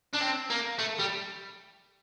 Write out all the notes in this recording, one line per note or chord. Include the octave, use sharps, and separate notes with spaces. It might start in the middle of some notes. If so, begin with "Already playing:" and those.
D4
C4
A#3
A3
G3